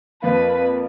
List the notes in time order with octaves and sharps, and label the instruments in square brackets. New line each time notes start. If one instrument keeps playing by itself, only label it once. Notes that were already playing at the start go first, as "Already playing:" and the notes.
[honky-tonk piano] F2 F3 A#3 F4 [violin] B4